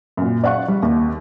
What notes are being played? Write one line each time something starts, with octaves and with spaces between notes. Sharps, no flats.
F#2 A#2
D5 F5 F#5 C#6
G3
D#2